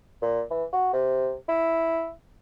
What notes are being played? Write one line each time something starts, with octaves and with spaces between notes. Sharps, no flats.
A#2
E3
F#4
C3
E4